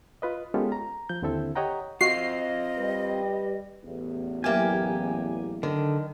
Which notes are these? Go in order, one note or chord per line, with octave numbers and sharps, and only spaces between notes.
F4 B4 D#5
G#3 B3 C#4 F4 G4 A4
A#5
F3 G6
D#2 D3 C4 E4 A4 E5
G4 C#5 D#5 F#5 G5 A#5
C4 F4 F#4 D#5 C7
G3 G4 B4
A1 E2
F#3 A#3 G4 E5 G#5 F6
D3 D#3